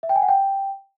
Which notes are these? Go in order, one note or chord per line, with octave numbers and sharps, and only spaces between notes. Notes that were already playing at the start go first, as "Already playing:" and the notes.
E5
G5
G#5
F#5
G5